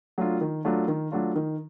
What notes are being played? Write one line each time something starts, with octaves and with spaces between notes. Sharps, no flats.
F#3 A3 D4 F4
D#3
F#3 A3 D4 F4
D#3
F#3 A3 D4 F4
D#3